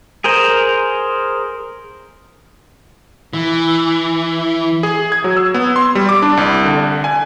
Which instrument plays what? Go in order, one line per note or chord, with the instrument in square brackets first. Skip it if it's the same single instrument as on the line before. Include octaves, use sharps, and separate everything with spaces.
[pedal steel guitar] G#4 A#4 C5
[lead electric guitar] E3
[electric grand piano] G#4
G#6
F#3
E6
B3
C6
G3
D6
D4
C2
D3
G#5